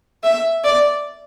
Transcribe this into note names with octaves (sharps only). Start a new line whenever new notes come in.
E5
D5